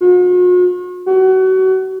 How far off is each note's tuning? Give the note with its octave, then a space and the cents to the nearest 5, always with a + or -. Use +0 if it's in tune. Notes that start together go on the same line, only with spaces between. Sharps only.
F#4 -45
F#4 +30